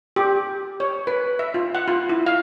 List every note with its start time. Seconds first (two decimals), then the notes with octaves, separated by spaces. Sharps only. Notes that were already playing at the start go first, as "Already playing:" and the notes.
0.16 G4
0.80 C#5
1.07 B4
1.39 E5
1.54 F4
1.75 F#5
1.88 F4
2.09 E4
2.26 F5